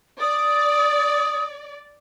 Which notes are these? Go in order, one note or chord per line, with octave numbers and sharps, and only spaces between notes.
D5 D#6